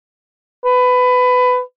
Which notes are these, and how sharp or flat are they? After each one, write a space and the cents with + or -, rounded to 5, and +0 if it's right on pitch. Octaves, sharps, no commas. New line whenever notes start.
B4 +20